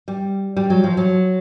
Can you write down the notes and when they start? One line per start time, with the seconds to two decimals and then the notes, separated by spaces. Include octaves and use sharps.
0.08 G3
0.57 G3
0.70 F#3
0.84 F3
0.97 F#3